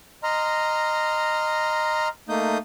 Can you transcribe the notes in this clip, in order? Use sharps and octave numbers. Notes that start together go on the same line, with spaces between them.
D#5 A#5 C6 F6
A3 A#3 D#4 D#6 G6